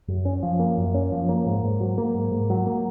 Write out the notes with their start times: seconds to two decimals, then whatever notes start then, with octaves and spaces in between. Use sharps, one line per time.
0.08 F#2
0.25 C#4
0.43 F3
0.59 A#3
0.78 F#2
0.94 C#4
1.12 F3
1.29 A#3
1.46 G#2
1.63 G#2
1.80 F#3
1.98 A#3
2.15 G#2
2.31 G#2
2.50 F#3
2.67 A#3